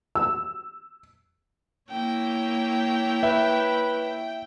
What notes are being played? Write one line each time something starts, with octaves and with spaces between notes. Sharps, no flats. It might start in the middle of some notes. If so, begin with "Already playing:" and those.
E6
A#3 E4 C#5 G5
B4 E5